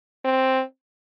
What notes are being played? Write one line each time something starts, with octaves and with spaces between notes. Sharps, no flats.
C4